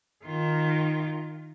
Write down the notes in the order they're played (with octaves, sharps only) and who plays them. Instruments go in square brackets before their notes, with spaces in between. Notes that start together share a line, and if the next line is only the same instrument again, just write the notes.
[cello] D#3 F4